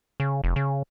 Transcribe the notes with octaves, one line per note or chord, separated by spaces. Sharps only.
C#3
F1
C#3